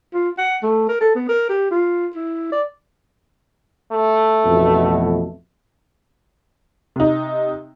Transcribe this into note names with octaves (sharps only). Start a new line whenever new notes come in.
F4
F#5
A3
A#4
A4
B3
A#4
G4
F4
E4
D5
A3
A1 F2 B2
C3 D#4